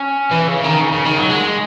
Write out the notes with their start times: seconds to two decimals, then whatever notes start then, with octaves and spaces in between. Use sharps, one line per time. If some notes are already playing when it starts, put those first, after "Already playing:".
Already playing: C#4
0.31 E3
0.48 C#3
0.64 D#3
0.81 C#3
0.93 C#3
1.06 D#3
1.18 F#3
1.31 G#3